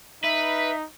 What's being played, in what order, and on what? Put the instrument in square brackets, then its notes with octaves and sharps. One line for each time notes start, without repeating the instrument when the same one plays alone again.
[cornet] D#4 [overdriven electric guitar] B4 [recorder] E5